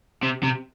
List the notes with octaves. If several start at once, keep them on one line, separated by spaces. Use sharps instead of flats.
C3
C3